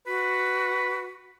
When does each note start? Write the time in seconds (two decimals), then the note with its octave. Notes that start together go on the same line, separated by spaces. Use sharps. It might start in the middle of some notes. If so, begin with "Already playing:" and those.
0.07 F#4 B4